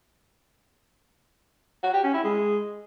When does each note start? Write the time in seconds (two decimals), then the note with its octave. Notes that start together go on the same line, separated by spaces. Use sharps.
1.83 F#4
1.93 G4
2.03 C#4
2.14 E4
2.24 G#3